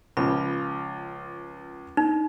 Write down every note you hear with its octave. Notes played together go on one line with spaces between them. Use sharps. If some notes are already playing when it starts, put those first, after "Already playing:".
C#2 F3 B5
D#4